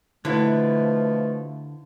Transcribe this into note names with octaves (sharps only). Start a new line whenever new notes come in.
B2 D3 F3 A3 E4